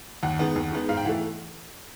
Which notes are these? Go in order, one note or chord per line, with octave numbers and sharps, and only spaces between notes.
D#2 F#5
D#3 G#3 B3
D#2
D#3 G#3 B3
G#2 F5
G5
E3 A3 F#5